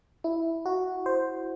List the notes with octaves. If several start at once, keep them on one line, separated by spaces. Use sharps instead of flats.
E4
F#4
C5